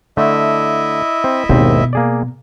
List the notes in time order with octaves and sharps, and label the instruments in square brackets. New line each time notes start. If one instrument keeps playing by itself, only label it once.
[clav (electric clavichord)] D3 A3 [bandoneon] E4 D#5 E5
[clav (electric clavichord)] C4
[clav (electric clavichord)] G#1 D#2 C4 [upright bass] B2
[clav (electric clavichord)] A#3 G#4 D5